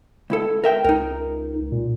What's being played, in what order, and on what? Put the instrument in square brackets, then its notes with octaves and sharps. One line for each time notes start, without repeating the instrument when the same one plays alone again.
[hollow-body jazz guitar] C#2 E4 A4
A#4 E5 G5
[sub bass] C#2 [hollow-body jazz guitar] D#4 A#4
[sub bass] A#2